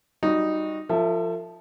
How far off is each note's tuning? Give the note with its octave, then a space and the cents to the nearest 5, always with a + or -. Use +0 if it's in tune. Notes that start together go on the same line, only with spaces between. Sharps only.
G3 +0 D#4 +0 F#4 -15
F3 +0 A4 +45 E5 +5